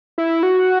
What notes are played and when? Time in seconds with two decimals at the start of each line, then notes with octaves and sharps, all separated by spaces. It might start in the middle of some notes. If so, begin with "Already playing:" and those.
0.18 E4
0.43 F#4